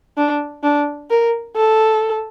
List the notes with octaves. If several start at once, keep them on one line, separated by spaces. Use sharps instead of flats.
D4
D4
A#4
A4